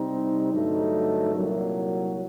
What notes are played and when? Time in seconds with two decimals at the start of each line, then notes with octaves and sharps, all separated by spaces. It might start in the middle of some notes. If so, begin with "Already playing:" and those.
Already playing: C3 G3 C4 D#4
0.53 G2 D3 F#3 A3 D#4
1.35 C2 A#2 F#3